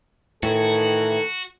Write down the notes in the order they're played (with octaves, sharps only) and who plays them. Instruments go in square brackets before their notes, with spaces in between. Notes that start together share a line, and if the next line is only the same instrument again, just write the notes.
[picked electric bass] A2 [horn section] D#3 E3 [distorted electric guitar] F#4 [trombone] A4